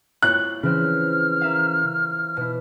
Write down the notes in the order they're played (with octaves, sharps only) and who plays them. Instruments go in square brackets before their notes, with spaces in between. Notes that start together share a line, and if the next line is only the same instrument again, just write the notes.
[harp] E4 F4 C#5 [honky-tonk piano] F#6
[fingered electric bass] C#3 [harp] E3 C4 [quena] F6
[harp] A#4 E5 F5
B2 E4